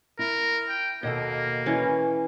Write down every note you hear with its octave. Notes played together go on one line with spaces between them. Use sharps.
E4 A#4
G5
D#2 B2 A#3 D#4 A4 D#5
E3 C#4 B4